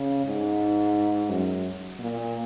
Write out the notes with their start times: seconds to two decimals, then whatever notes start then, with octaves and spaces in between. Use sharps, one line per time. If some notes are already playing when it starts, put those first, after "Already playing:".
Already playing: C#3
0.25 G#2
1.30 F#2
1.99 A#2